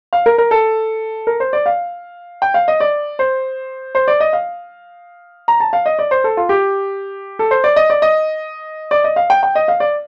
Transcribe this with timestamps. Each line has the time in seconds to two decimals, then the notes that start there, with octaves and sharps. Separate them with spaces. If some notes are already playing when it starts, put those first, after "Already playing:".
0.13 F5
0.26 A#4
0.38 A#4
0.51 A4
1.27 A#4
1.40 C5
1.53 D5
1.66 F5
2.42 G5
2.54 F5
2.68 D#5
2.80 D5
3.19 C5
3.95 C5
4.08 D5
4.20 D#5
4.33 F5
5.48 A#5
5.60 A5
5.73 F5
5.86 D#5
5.99 D5
6.11 C5
6.24 A4
6.37 F4
6.49 G4
7.39 A4
7.51 C5
7.64 D5
7.76 D#5
7.90 D5
8.02 D#5
8.91 D5
9.04 D#5
9.16 F5
9.30 G5
9.43 G5
9.55 D#5
9.68 F5
9.80 D5